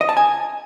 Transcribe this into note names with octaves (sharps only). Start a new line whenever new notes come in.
D#5
A5
G#5